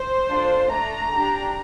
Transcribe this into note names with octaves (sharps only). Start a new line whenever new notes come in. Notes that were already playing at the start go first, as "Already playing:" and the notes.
Already playing: C5
D4 F4 A4
A3 D4 A4 A#5
D4 G4